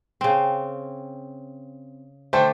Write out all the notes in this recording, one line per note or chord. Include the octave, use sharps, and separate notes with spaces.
C#3 C4
D3 A3 C5 G5 A5